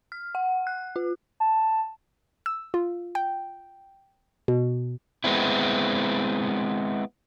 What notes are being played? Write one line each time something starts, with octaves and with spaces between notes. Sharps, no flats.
F6
F#5
F#6
F4
A5
E6
F4
G5
B2
G#3 B3 C4 E4